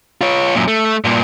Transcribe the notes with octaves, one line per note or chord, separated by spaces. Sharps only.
F4 C#5
F#2 A#2
A3
G2 A#2